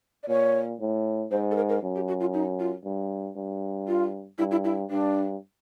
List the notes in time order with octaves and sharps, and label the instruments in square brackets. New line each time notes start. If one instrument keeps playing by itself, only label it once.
[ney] D5
[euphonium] A#2 [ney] C#5
[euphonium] A2
[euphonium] G#2 [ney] C5
[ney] A4
A#4
A#4
[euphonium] F#2
[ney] G4
F#4
F4
D#4
F4
[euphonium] G2
G2
[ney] F4
[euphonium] G2 [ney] E4
[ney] E4
E4
[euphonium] G2 [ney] D4